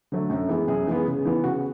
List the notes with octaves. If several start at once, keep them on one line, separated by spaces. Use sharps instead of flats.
D3 F#3 A3
F#2
E3 G#3 B3
F#2 G#4
E3 G#3 B3
C#3
E3 B3
C#3 F#4